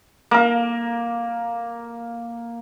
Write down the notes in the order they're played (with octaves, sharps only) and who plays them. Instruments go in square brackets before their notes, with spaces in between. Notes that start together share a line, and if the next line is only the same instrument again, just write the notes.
[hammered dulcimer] A#3 A#4